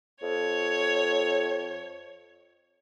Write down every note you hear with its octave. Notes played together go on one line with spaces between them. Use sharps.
F2 C#5